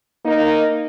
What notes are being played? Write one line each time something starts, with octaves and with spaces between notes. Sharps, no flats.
A#3 D#4